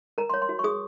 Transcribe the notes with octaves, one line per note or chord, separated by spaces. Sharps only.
A#4 A#5
C6
C#5
C6
F#4
C#6
G#4 D#6